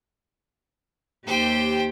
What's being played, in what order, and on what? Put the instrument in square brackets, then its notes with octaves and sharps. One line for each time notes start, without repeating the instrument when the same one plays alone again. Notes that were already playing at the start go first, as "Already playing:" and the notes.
[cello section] D#2 G4 [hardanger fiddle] C5 G5